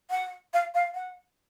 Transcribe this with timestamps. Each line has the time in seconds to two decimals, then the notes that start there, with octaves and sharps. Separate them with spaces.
0.11 F#5
0.53 F5
0.74 F5
0.94 F#5